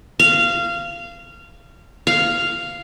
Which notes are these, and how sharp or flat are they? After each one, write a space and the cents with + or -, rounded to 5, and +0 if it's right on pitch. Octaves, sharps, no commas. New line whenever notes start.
F5 -20
F5 -5